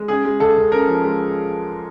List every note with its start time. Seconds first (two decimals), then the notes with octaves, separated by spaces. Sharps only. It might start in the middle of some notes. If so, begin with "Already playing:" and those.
Already playing: G#3
0.08 C#3 G#4
0.25 G#3
0.40 C#2 A4
0.57 C#2
0.72 C#3 A#4
0.88 F3
1.04 G#3